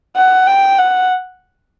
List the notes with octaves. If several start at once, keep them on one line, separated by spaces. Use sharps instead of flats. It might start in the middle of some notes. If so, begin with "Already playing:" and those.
F#5
G5
F#5